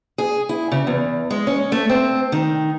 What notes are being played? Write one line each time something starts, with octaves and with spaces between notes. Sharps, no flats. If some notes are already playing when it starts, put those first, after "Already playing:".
G#4
E4
C#3
E2
G#3
C#4
A3
C4
D#3